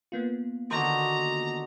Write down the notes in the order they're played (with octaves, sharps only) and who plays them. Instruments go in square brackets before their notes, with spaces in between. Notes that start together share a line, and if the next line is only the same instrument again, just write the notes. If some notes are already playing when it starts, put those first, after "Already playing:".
[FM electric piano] A#3 B3 F4
[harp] D3 D#3 [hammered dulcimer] F#4 C6 [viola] A#5